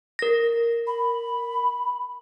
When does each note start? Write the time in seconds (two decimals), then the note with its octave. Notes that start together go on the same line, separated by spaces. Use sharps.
0.19 A#4 A#6
0.87 B5